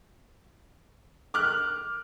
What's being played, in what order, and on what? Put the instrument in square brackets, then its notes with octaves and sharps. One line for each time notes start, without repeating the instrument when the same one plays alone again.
[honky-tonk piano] D6 F6 F#6